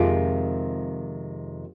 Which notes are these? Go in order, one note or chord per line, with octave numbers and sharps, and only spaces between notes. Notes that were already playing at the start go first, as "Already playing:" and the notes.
Already playing: F2 C3 D#3 G#3 C4 F4 G4